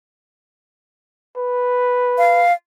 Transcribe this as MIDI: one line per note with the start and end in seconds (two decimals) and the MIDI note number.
1.37 2.45 71
2.18 2.53 77